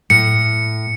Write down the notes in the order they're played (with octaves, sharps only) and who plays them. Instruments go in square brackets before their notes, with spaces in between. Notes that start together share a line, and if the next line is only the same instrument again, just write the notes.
[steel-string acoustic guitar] A2 [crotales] C#7